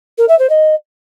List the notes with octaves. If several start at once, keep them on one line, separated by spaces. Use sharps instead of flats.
A#4
E5
C5
D#5